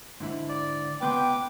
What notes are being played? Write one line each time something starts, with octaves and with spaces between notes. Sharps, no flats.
G#2 D3 E4
D5
C#2 B3 B4 G5 C6 D6